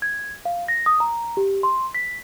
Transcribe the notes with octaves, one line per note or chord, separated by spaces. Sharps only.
G#6
F5
A#6
D#6
A#5
G4
C6
B6